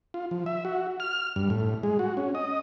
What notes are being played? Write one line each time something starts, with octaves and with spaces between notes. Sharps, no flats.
F4
F3
E5
F#4
F6
G2
A2
G#3
F#4
C#4
D#5